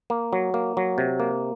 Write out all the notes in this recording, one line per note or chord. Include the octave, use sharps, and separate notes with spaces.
A#3
F#3
A#3
F#3
C3
A#3